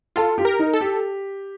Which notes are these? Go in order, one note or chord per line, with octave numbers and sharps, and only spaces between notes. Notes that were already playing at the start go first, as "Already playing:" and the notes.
F4 A4
G4
A#4
D#4
A4
G4